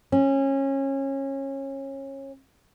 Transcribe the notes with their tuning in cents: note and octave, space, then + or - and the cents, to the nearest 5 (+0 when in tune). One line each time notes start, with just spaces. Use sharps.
C#4 -25